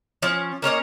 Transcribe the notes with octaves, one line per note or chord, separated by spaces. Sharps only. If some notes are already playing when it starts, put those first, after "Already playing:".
F3 C#4
A#3 C#4 C#5 D#5